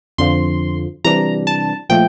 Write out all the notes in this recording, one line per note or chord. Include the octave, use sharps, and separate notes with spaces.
F2 D3 F3 C6
C3 E3 G3 D4 A#5
A5
A#2 F3 A3 G5